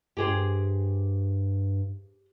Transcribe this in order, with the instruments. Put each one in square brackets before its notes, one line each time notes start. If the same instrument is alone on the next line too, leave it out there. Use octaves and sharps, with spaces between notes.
[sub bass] G2 [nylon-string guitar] G4 G#4 C5